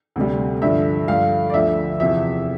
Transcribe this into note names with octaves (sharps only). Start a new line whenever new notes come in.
D2 C3 G3
G2 D3 F3 E5
G2 D3 F3 F5
D5
D2 D3 F3 E5
E2 C3 F3 E5